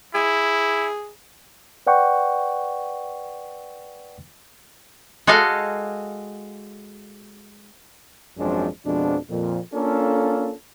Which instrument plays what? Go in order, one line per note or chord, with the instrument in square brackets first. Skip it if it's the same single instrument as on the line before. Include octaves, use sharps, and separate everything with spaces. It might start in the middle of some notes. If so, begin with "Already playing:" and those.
[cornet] E4 [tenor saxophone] G#4
[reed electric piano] B4 D5 F#5 G5 C#6
[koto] G#3 F#4 A4 D#5 F5
[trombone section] G#1 F#2 F3 G#3 C4 D4
F2 B2 F3 G#3 D4
F2 A#2
A#3 C#4 D4 F4 A4